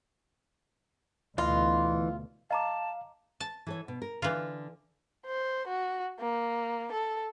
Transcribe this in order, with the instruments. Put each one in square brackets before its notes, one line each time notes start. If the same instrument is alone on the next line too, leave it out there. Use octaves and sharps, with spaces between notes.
[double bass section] D2 B2 [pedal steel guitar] E3 D#5 C6 [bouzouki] F4
[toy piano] D#5 A#5 D6 [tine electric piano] F5 [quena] A5
[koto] A5
[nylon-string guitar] E3 A4 C#5
B2
A#4
[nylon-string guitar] D3 [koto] E3 F4
[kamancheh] C5
F#4
A#3
A4